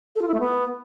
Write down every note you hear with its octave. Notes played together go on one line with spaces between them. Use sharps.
A4
F4
E4
A3
B3